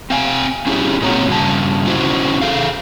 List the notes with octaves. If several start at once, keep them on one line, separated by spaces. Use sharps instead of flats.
C4 F5 G#5
C#4 D#4 E4 G4 G#4
A#2 G#3 C4 F#4 C#5 A#5
G2 C#3 A5
C#4 D#4 E4 F#4 C5
G#4 A4 F5